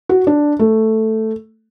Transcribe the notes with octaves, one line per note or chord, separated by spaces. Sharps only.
F#4
D4
A3